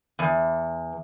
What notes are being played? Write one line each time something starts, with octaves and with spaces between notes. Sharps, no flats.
E2